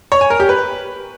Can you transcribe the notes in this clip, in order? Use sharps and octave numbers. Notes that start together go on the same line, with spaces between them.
C#5
G#5
A#4
G4
B4